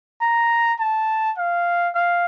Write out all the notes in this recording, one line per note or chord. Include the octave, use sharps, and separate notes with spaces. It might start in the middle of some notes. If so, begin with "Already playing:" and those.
A#5
A5
F5
F5